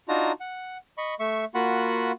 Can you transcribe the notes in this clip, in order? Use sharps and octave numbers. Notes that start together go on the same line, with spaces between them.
D4 D#4 F4 F#4 A#5
F#5
D#5 B5 C#6
A3 E5 C#6
A#3 F4 F#4 F#5 B5